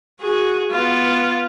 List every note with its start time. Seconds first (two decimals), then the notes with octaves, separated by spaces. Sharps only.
0.21 F#4 G#4
0.71 B3 F4